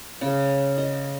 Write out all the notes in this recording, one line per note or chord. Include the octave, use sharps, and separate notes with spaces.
C#3
D#5